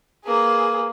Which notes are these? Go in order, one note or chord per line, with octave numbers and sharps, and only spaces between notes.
A#3 G#4 B4